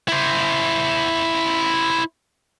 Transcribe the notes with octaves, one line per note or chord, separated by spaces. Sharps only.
E4 C5